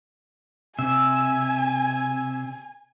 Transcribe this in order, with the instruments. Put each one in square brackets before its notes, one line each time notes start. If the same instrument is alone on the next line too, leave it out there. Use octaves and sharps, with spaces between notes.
[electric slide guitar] C3 [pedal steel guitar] E5 [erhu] G#5